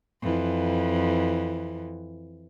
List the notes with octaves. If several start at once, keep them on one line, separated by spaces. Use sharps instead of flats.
F2 E3